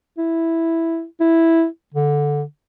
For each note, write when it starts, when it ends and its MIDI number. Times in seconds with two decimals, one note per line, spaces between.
0.18 1.04 64
1.20 1.66 64
1.94 2.43 50